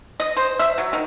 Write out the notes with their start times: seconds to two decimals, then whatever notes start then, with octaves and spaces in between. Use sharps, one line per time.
0.20 D#5
0.37 C5
0.59 E5
0.78 F#3
0.93 D#3